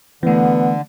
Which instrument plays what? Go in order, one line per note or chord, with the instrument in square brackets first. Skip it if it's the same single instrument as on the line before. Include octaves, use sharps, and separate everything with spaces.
[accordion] D3 [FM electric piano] E3 A3 [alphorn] B3